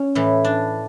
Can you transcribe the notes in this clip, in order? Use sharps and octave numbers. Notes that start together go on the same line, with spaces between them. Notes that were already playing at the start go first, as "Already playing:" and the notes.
Already playing: C#4
A2 E3
D4